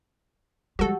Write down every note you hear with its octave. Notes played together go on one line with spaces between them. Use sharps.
F3 G3 G#3 F#4 G4 A4 F#5